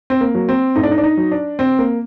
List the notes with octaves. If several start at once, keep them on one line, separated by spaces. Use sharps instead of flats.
C4
A#3
F#3
C4
A2 D#4
D4
D#4
D4
D#4
F#3
D4
C3 C4
A#3